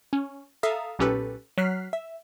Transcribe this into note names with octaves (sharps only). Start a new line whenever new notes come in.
C#4
A4 E5 F5 A#5 D#6
B1 A#2 C#4 G4 A4 B4
F#3 F6 F#6 B6 C7
E5